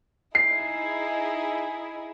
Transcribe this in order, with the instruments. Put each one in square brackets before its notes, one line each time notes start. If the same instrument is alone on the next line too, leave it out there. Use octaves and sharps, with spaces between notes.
[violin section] D#4 E4 G#4 [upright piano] C7